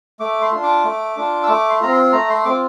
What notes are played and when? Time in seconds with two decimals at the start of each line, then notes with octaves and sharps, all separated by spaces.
0.20 A3 D6
0.42 C6
0.52 D4 F4
0.63 D6
0.84 A3
1.17 D4 F4
1.43 E6
1.48 A3 D6
1.70 C6
1.81 C4 F4 A#5
1.92 C6
2.13 A3 A#5
2.29 C6
2.45 C4 F4 D6